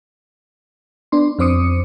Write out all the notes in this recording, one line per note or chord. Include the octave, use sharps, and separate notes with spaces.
B3 D4 C6
F2 C4 C5 D6 D#6 C#7